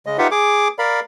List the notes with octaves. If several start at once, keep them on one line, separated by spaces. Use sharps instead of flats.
C#3 G#3 D#5
D#4 F4 G4 B4 E5 F#5
G#4 D6
A#4 D5 F5 B5